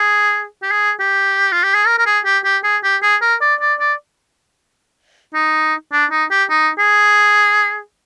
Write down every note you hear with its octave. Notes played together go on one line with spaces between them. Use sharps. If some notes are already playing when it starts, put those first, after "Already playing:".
Already playing: G#4
G4
G#4
G4
F4
G4
G#4
A#4
A#4
G#4
G4
G4
G#4
G4
G#4
A#4
D5
D5
D5
D#4
D4
D#4
G4
D#4
G#4